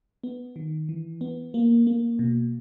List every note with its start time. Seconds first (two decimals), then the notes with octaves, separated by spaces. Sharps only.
0.24 B3
0.56 D#3
0.89 E3
1.21 B3
1.54 A#3
1.87 A#3
2.19 B2